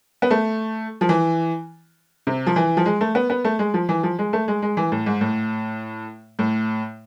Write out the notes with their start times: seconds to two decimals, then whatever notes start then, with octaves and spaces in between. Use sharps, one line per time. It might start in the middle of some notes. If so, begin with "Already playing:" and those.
0.22 B3
0.31 A3
1.01 F3
1.09 E3
2.27 C3
2.47 F3
2.56 E3
2.77 F3
2.86 G#3
3.01 A3
3.15 B3
3.30 B3
3.45 A3
3.59 G#3
3.74 F3
3.89 E3
4.03 F3
4.19 G#3
4.33 A3
4.48 G#3
4.62 G#3
4.77 E3
4.92 A2
5.06 G#2
5.21 A2
6.39 A2